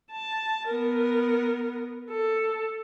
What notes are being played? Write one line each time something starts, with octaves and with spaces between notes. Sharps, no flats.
A5
B3 A#4
A4